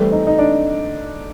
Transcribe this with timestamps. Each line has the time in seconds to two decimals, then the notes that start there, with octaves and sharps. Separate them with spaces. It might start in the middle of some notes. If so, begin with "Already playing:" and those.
Already playing: E3 G3 A3 C4
0.12 D#4
0.27 D#4
0.38 D4